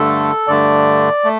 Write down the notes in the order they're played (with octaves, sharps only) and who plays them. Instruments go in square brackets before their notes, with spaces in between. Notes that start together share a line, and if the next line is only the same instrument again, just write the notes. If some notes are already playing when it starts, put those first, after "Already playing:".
Already playing: [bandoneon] G2 D3 A3 A4
G2 D3 A3 D5
A3